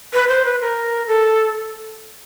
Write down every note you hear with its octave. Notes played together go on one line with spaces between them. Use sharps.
B4
C5
B4
A#4
A4